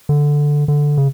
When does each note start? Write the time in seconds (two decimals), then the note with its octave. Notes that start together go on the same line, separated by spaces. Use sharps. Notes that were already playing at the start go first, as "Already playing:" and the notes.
0.09 D3
0.68 D3
0.98 C#3